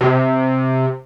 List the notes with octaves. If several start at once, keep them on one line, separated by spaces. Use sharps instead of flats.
C3